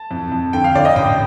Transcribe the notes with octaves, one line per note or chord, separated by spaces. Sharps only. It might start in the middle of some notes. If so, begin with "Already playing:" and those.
Already playing: A5
F2
F2
D3 G5
F5
D3 D5
D#5
A1 G5